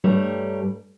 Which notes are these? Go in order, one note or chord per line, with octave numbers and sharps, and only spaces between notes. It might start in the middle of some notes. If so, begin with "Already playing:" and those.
G2 G3 A3 C#5 A#5